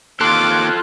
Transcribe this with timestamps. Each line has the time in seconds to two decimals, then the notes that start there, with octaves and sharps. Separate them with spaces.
0.21 D#2 F4 A4 C6 D6 F6 F#6